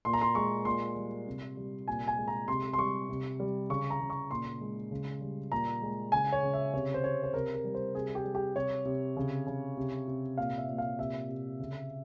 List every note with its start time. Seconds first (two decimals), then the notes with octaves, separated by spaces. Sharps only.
0.05 A#2 C6
0.13 A#5
0.21 C6
0.35 G#3 C#6
0.65 A#2 C6
0.96 G3
1.27 C3
1.57 G3
1.88 A#2 G#5
2.08 G#5
2.18 G#3
2.28 A#5
2.48 C3 C6
2.73 C6
2.78 G3 C#6
3.09 C3
3.40 G3
3.70 C#3 C#6
3.90 A#5
4.00 C#3
4.10 C#6
4.31 A#2 C6
4.61 G#3
4.91 C#3
5.21 G3
5.52 A#2 A#5
5.82 G#3
6.12 C#3 G#5
6.32 C#5
6.43 C#3
6.53 E5
6.73 C3 C#5
6.94 C5
7.04 C3 C#5
7.24 C5
7.34 C3 A#4
7.54 A#4
7.64 G3
7.75 C5
7.95 C3 G#4
8.15 G4
8.25 G3
8.35 G4
8.56 C3 C#5
8.85 C3
9.16 C#3
9.46 C#3
9.77 C3
10.08 C3
10.37 A#2 F5
10.58 E5
10.68 A#2
10.78 F5
10.98 C3 E5
11.29 C3
11.59 C#3